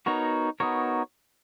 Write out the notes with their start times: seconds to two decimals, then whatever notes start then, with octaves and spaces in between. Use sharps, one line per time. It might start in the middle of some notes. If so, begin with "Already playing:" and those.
0.06 B3 D#4 F#4 A#4 C#5
0.60 B3 D#4 F#4 A#4 C#5